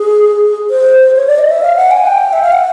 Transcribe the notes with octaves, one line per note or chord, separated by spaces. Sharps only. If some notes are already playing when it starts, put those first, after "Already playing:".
Already playing: G#4
C5
C#5
D5
D#5
E5
F5
F#5
G#5
G5
E5
F5
F#5